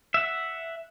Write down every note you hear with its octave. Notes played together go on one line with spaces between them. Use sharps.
E5 F#5